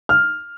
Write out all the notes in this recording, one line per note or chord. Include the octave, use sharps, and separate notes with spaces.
F6